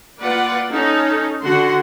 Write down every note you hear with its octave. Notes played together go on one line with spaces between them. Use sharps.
A#3 F4 B4 D5 F#5
C#4 D#4 A4
D3 F#4 F#5 C6